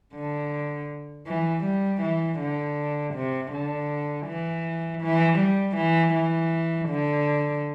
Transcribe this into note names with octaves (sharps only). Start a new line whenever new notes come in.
D3
E3
G3
E3
D3
C3
D3
E3
E3
G3
E3
E3
D3